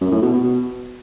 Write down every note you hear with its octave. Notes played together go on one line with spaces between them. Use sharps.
F#2
A2
B2
B2
B2